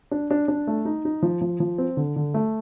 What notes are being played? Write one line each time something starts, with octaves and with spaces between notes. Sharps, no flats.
D4
D4
D4
A3
D#4
D#4
F3
F3
F3
C4
D3
D3
A3